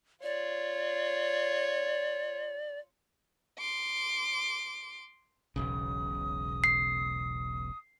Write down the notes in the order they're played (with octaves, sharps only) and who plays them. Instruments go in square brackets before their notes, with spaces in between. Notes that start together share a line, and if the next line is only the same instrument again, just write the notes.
[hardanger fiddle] F4 C#5 [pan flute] D5
[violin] C6 D6
[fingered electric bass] E1 B1 C#3 [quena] D#6
[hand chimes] C7